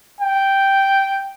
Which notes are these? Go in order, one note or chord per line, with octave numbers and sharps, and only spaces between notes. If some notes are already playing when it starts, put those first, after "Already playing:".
G5